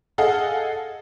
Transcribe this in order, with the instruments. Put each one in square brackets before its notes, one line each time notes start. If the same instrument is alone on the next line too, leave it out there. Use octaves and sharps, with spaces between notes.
[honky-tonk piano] G#4 A4 D#5 F5 F#5